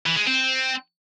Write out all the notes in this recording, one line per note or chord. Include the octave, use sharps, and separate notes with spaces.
E3
G#3
C4